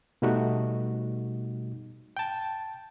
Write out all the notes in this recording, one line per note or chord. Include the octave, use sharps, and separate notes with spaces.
B2 G3 A3 D#4 F#4
G5 A5